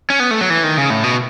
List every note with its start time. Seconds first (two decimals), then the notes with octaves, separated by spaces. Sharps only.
0.10 C#4
0.20 B3
0.31 A3
0.41 F#3
0.50 E3
0.63 D#3
0.78 C#3
0.90 A2
1.04 B2